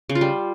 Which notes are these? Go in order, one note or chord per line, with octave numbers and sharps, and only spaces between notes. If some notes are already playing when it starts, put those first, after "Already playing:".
C#3
F4
G3